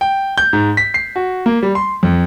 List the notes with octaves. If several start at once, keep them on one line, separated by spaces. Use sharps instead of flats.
G5
G6
G#2
B6
C7
F#4
A#3
G3
C6
F2